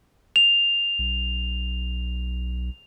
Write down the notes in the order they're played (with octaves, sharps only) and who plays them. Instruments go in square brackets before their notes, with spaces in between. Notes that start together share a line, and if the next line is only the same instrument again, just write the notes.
[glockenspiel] F7
[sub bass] B1